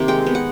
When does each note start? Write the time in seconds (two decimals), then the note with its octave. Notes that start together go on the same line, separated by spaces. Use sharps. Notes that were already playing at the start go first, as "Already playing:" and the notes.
Already playing: C3 D#3 A#3
0.08 G#3 G5
0.26 B3
0.35 F#5